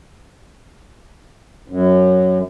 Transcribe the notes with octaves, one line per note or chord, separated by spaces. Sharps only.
F#2